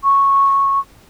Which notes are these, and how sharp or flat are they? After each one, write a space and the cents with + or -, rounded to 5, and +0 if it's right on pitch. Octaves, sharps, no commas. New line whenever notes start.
C#6 -10